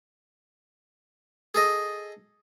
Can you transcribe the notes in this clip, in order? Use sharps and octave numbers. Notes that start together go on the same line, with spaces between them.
G#4 A4 D#5